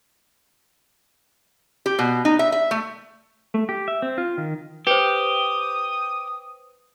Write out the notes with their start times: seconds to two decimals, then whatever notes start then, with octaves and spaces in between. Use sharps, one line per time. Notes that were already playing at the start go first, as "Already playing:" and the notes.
1.86 G4
1.99 B2
2.25 D#4
2.39 E5
2.52 E5
2.71 A3
3.54 A3
3.69 G4
3.88 E5
4.02 C4
4.18 F4
4.38 D#3
4.87 G4 B4 C5 D#6